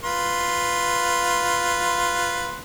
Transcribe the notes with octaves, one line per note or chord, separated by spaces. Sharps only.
F4 B4 C6